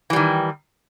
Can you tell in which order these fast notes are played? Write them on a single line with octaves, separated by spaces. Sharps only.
E3 G3 D#3